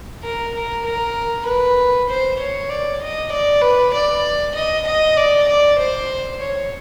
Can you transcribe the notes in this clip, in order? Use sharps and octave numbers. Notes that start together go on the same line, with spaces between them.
A#4
A#4
A#4
B4
C5
C#5
D5
D#5
D5
B4
D5
D#5
D#5
D5
D5
C5
C#5